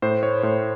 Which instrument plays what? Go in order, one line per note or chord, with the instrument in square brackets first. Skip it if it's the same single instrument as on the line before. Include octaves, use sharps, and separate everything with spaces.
[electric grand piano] A2 C5
C#5
A2 C5